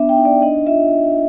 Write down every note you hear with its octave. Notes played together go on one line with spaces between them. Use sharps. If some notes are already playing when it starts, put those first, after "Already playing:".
Already playing: B3 D4 E5
G5
D#4
D5
D4 D#5
F4 E5